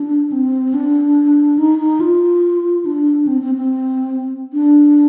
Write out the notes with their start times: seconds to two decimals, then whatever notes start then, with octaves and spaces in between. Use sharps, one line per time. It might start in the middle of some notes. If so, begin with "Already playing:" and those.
Already playing: D4
0.32 C4
0.74 D4
1.58 D#4
1.79 D#4
2.00 F4
2.85 D4
3.27 C4
3.41 C4
3.55 C4
4.53 D4